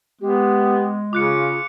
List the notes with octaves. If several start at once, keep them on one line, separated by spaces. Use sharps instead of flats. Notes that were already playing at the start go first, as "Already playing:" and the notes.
G#3 B3 G4
C#3 F4 D6 F#6 C#7